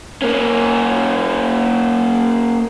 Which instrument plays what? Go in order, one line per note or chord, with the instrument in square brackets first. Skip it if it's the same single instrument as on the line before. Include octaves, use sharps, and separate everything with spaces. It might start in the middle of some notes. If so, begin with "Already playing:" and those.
[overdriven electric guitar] A#3 C#4